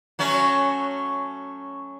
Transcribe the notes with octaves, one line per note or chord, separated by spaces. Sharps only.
F#3 A3 C#4